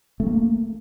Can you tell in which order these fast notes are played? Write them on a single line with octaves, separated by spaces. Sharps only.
A3 C4 A#3